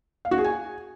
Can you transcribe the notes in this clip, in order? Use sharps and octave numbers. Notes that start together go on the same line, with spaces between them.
F5
F#4
G#4
G#5